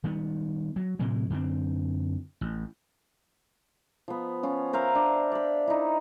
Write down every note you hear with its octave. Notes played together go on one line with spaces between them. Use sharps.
D#3 G3 B3
F#3
A2 C3 E3 F#3
F#2 D3 C4
A1
F3 B3
C#4 F4
A#4 C5 E5 F5
D4
D5 B5
D#4 E4